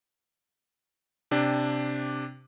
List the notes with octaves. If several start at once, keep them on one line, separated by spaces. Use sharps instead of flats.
C3 D4 G4